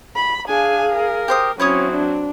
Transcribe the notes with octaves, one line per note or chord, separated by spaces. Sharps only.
B5
D4 G#4 F5 G#5
A#4
G4 C5 D#6
F#3 C4 C#4 E4 C#5 D#6
D4